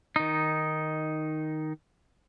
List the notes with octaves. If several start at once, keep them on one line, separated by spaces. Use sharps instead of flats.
D#3 D#4